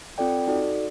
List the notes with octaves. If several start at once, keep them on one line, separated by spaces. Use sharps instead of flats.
C4 F4 A4 D5 G5
D#4 F#4 A4 D5